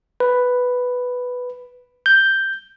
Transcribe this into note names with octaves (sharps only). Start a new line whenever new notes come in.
B4
G6